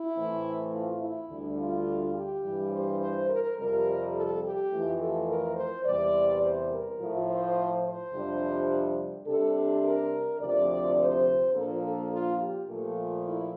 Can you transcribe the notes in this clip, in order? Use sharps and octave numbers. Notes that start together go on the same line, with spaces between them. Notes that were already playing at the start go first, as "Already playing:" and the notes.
Already playing: E4
A2 E3 A3 C4
F4
E4
D2 D3 G3 D4
F4
G4
G2 E3 G3
C5
C5
A#4
F2 C3 G3 A#4
A4
G4
F2 E3 A3
A4
A#4
C5
E2 C3 G3 C4 D5
C5
A#4
A2 F3 A3
C5
C5
F2 C3 G3 D4
C3 G3 D4 A4
A4
A#4
D2 C3 F3 C4 D5
C5
A#2 F3 A#3 D4 A4
A4
F4
G4
A#2 F3 A3
E4